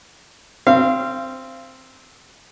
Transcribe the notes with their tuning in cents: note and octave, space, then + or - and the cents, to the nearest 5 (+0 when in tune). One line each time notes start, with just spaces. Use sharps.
C4 +0 F5 -30